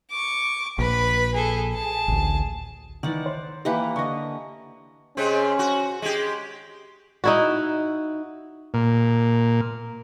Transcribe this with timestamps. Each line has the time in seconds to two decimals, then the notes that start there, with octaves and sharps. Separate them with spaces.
0.11 C#6 D6
0.79 A#1 B4 B5
1.34 G#4 A4
1.75 G#4 A5
2.08 A1 D2
3.03 D#3 E3 D5 F#5
3.26 C5
3.65 E3 A#3 G4 B4 F#5
3.96 D3 D#5 C#6
5.17 C3 G#3 C4 C#4
5.59 F#4
6.02 G#3 G4
7.24 D#4 E4 F#4
8.74 A#2